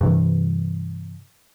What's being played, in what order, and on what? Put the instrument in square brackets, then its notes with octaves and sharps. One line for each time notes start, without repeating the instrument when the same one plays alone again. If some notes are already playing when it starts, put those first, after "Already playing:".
[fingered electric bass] G2 C3 E3